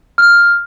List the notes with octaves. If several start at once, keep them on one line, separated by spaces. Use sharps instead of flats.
F6